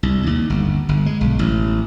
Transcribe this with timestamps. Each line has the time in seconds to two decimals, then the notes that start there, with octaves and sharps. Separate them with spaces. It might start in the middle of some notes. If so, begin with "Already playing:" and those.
0.03 C2
0.27 D#2
0.50 G1
0.89 G1
1.06 G#3
1.21 B1
1.39 A1